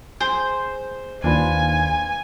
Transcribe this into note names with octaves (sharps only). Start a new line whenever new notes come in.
G#4 C5
D#2 D4 F4 B4 G#5